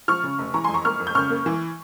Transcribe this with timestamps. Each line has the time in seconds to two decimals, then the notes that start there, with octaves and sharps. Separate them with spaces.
0.08 F3 C#6 F6
0.23 C#3
0.39 F1
0.54 E3 A#5 C#6
0.64 G#5 C6
0.69 F2
0.74 A#5 C#6
0.85 A#3 C#6 F6
1.00 F2
1.07 G6
1.15 C#3 C#6 F6
1.30 A#3
1.46 E3